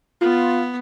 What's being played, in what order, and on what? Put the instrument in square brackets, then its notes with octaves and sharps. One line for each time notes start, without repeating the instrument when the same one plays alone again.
[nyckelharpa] B3 [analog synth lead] F4